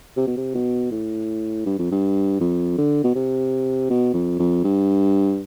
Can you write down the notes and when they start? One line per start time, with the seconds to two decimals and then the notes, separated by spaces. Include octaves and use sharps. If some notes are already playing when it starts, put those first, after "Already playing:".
0.17 C3
0.27 B2
0.37 C3
0.55 B2
0.91 A2
1.66 G2
1.79 F2
1.91 G2
2.40 F2
2.78 D3
3.04 B2
3.15 C3
3.90 B2
4.14 F2
4.39 F2
4.64 G2